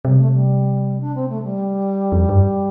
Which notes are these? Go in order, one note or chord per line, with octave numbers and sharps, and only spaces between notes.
C3 G3
A3
G3
D4
C4
A3
G3
F2
G2